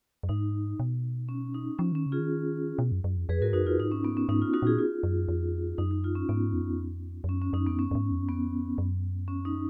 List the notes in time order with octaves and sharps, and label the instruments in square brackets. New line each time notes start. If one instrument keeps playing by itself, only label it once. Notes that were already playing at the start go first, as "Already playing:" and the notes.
[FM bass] F#2
[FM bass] G#2 [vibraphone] D#4
[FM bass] B2
[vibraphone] C#4
D#4
[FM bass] F3 [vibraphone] C#4
[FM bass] D#3 [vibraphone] C#4
[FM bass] C#3
[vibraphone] F4 G#4
[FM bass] D#3
B2
F#2
F#2
F2
[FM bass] F2 [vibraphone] G#4 B4
[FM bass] G#2 [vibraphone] F#4 A#4
[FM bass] F#2 [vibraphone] D#4 F#4
[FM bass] F2 [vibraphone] F4
[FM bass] G#2 [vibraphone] D#4
[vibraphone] C#4
B3
C#4
[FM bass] G#2 [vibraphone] D#4
[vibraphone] F4
D#4 F#4
[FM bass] A#2 [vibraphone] F4 G#4
[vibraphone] F4
[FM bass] F#2
F2
[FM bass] F#2 [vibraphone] D#4
[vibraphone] D#4
F4
C#4
[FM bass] G#2 [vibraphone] B3
[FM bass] F2
F#2
F2
F2
[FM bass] F#2 [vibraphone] C#4
[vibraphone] C#4
[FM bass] F#2 [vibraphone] D#4
[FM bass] F2 [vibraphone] B3
[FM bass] F#2 [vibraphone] C#4
[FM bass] F#2
G#2
F2
F#2
[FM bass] F2 [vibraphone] B3
[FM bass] F#2
[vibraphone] C#4
D#4